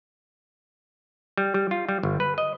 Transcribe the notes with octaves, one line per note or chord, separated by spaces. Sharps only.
G3
G3
F4
G3
G1
B4
D#5